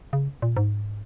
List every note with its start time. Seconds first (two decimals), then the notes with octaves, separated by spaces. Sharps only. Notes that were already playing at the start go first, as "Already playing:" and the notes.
0.13 C#3
0.42 A#2
0.57 G#2